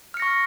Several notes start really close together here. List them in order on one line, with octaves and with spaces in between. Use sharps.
F6 C#7 A#6 C#6